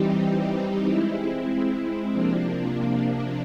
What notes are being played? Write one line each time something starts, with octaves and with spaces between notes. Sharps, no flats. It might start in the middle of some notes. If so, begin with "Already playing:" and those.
Already playing: E3 G3 C4 D#4 G4
G#3 C4 E4
C3 F3 A#3 D4